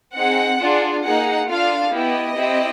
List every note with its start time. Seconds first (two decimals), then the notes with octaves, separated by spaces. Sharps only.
0.15 C4 D#4 G#4 F#5
0.60 D4 F4 G#4
1.04 A#3 D#4 G#4 F#5
1.49 D4 F4 A4 F5
1.93 B3 E4 G4 D#5
2.38 C4 E4 G4